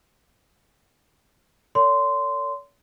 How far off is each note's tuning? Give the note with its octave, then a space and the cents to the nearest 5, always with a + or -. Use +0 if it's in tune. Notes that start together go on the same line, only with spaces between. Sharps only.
A#4 -40 C#5 +40 C6 -15